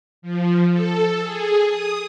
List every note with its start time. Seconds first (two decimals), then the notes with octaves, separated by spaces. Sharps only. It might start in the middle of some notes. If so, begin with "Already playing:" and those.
0.22 F3
0.71 A4
1.21 G#4
1.66 D#6